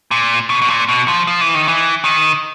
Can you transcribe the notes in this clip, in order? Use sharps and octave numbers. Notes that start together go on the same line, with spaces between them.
A#2
B2
B2
A#2
B2
F3
F3
E3
D#3
E3
D#3